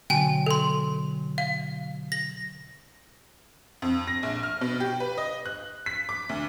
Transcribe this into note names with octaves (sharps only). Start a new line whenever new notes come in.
B2 D3 F#3 G5 G#5
A4 C6
F5
A#6
F2
A#6
A#1
F6
B2
G4
B4
D#5
F#6
B6
D6
D2